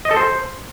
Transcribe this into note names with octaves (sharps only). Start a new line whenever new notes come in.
D#5
A4
C5